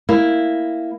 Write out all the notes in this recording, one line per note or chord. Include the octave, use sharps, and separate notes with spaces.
A#3 E4